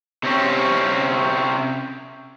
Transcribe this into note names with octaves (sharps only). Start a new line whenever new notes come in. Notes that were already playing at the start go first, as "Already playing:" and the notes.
C3 C4 C#4